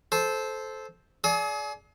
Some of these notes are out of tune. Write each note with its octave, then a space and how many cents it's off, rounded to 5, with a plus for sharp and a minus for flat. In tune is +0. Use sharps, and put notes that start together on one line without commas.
A4 -15 C5 +0
G#4 +30 D5 -15 D#6 +45